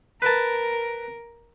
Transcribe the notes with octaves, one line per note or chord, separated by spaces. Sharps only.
A#4 B4 A5